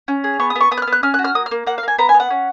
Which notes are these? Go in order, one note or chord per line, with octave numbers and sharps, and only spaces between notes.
C#4
G#4
B3 C#6
D#6
B3
C#6
B3 D#6
F#6
F6
B3
F#6
C#4 F6
F#6
F#4
F6
A#3 D#6
F6
A#3
A#3 F#5
F5
A#3 G#5
B3 A#5
G#5
B3
F#5
C#4